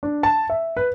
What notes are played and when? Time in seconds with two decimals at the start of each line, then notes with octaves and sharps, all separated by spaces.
0.03 D4
0.23 A5
0.50 E5
0.77 B4